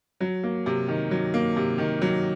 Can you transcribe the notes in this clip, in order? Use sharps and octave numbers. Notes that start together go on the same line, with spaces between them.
F#3
A#3
C3
D#3
F#3
A#3
C3
D#3
F#3